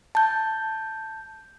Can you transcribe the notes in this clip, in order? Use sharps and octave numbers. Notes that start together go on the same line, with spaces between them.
A5 G6